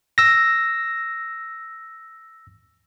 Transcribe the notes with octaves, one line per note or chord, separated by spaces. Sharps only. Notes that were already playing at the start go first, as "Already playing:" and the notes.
E6 A#6